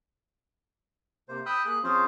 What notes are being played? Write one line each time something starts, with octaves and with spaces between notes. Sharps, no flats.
C3 A#3 C5
G5 B5 D#6 E6 F#6 G6
A#3 G#4 F#6
F3 C4 C#4 F4 G#4 C5